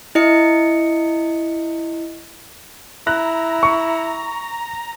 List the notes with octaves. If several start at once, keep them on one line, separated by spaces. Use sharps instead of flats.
E4 D#5 C#7
E4 A#5 F#6
C#6